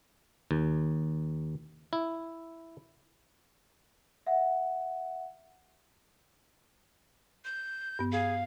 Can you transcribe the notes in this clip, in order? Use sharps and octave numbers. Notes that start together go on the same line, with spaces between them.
D#2
E4
E5 F#5
G6
G2 B3
G#4 F5